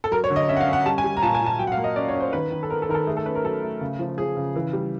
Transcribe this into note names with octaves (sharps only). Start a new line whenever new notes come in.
A4
F#3 A#4
C#5
D3
D#5
C#4 E5
F#5
F5
C#4
F#5
G3 A5
G#5
G3
A#5
A#2 A5
G#5
A#2
A5
F#3 G5
F#5
F5
A#3
D#5
C#4 D5
C#5
C#4
C5
D#3 B4
D#3
A4
B3 A#4
A4
D#3 A#4
A4
A3 G#4
A4
C#4 B4
A#4
F#3 A4
A3
C#3
F3
F3 G#4
C#3
E3
G3